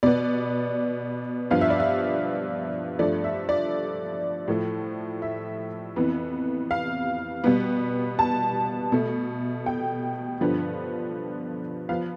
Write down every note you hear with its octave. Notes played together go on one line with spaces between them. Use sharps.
B2 B3 D5
G2 F3 B3 F5
E5
D5
E5
G2 F3 A3 D5
E5
D5
A2 F3 A3
E5
F2 E3 B3
F5
B2 G3 B3
A5
B2 A3
G5
G2 D3 F3 B3
F3 B3 F5